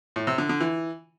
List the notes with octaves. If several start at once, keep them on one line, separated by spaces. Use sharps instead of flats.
A2
C3
D3
D3
E3